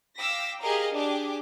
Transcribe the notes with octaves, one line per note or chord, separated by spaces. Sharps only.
F5 G5 D6 E6 A#6 B6
G4 G#4 A#4 D#5 F5 A#5
D4 G4 G#4 D6